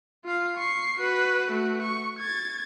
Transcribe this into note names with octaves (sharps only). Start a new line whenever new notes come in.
F4 F5
C#6 C7
F#4 B4
A3 F#4
C#6
G#6 A6